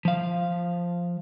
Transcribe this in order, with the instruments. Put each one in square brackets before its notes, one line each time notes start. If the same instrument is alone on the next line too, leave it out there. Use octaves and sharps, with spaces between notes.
[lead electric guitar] F3 F5